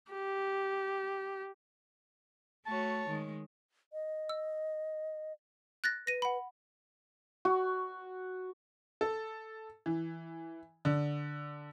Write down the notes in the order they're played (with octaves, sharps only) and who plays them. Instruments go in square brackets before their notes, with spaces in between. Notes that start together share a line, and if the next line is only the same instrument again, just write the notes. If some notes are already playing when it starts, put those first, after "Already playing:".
[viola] G4
[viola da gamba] A3 F#4 C#5 [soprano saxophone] A5
[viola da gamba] D#3 G#3
[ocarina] D#5
[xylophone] E6
F#6 A6 A#6
[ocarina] B4 [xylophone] A#6 D#7
[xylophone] F#5 B5
[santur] F#4
[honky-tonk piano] A4
E3
D3